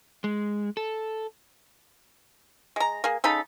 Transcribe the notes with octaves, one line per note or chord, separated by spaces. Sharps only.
G#3
A4
G#3 A#5
A#3 G#4
C#3 D#4 A4 B5